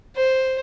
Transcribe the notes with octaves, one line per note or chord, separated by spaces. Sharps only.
C5